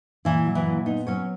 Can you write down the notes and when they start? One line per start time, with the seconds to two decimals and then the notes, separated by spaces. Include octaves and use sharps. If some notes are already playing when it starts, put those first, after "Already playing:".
0.25 A#2 E3 E4
0.45 F#3
0.55 E3 E4
0.66 A#2
0.86 B3 D#4
1.07 F#3 C#4 C#5